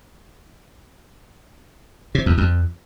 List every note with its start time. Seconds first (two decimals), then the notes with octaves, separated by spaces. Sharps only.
2.15 C3
2.26 E2
2.38 F2